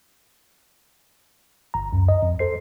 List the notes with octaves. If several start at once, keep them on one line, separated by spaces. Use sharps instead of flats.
G1 A#5
C#2 F#2
D#5
F2
A4 C5 C7